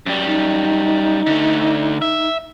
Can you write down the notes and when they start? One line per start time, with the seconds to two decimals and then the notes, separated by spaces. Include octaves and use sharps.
0.06 F#2 G3
0.27 D#4
1.27 D3 A3
2.02 E5